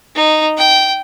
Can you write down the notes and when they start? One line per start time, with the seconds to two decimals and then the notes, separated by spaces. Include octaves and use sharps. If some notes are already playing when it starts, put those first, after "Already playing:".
0.16 D#4
0.58 G5